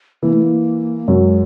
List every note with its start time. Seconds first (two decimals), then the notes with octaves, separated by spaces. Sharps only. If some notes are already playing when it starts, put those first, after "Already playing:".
0.23 E3 A#3
0.33 A3
0.42 A#3
1.08 F#2 F#3 G#3